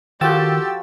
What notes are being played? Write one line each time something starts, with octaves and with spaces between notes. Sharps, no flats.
D#3 F3 F#4 G4 A4 G5 E6 A6